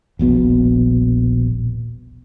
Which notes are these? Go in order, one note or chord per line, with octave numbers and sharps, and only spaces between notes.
D#1 A#1 B2 B3